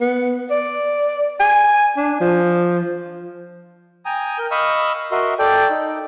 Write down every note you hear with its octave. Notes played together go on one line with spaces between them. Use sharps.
B3
D5
G#5
D4
F3
G5 G#5 A#5 D#6
A#4 G6
D#5 F5 B5 C#6 D#6 E6
F#4 A#4 D#5 E5 C6
A4 D5 G5
D#4